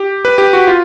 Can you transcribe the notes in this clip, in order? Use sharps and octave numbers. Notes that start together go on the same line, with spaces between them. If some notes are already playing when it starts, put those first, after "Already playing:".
Already playing: G4
B4
G4
F#4
F4